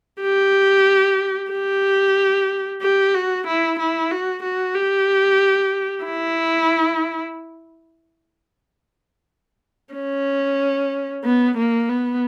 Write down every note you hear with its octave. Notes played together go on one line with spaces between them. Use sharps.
G4
G4
G4
F#4
E4
E4
F#4
F#4
G4
E4
C#4
B3
A#3
B3